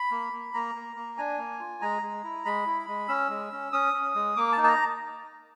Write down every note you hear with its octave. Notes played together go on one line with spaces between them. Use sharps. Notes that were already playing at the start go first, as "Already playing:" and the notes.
Already playing: B5
A#3
A#3
A#3 A#5
A#3
A#3
D4 G#5
A#3
F4
G#3 A#5
G#3
E4
G#3 B5
E4
G#3
C#4 E6
G#3
C#4
C#4 D#6
C#4
G#3
A#3 D6
A5
D#4
A5
A#5